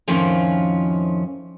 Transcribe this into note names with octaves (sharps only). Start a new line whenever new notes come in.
F2 A2 D#3 F3 C#4 F4